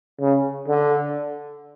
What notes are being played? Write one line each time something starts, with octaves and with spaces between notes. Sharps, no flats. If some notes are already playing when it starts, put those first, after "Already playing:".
C#3
D3